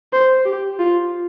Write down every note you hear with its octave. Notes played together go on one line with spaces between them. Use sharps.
C5
G4
F4